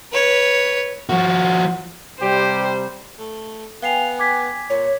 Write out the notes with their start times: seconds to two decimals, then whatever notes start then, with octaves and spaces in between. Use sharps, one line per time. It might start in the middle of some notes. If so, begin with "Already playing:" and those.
0.12 B4 C#5
1.09 F3 F#4
2.22 C3 G3 G4 C5
3.19 A3
3.82 B3 F5 G5 G#5 C7 F7
4.19 D6 G#6 B6
4.70 A#2 C#5